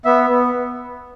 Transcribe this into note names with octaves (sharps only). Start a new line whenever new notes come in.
B3 E5
B3